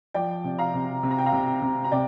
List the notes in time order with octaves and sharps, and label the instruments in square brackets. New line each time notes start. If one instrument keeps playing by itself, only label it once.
[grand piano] F3 [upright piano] D5 G5
[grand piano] C3
[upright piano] F5 A#5
[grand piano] C3
C3
[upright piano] A#5
G5
F5 A#5
[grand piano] C3
C3
[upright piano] A#5
[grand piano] C3 [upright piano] D5 G5